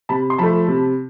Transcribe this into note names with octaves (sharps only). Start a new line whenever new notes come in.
C3 A5 B5
C6
F3 A3 A5 B5
C3